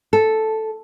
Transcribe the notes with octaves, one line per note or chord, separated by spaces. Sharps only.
A4